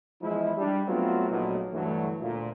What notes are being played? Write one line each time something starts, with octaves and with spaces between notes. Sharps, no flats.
E2 F3 G#3 E4
G3 D4
F#3 A3 B3 C4 F4
A#1 A#2 F#3 A3 B3 D#4
D2 G2 E3 F#3 A3
D2 A#2 A#3